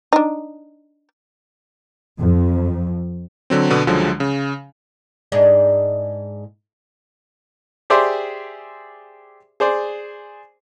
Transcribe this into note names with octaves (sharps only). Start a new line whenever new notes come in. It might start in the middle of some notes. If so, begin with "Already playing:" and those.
D4 D#4
F2
D3 F#3 C4
B2 D3 B3
C#2 D3 F3 F#3 G#3
C#3
G#2 G#3 D4
G4 G#4 C5 D5 E5 C6
G#4 C5 D5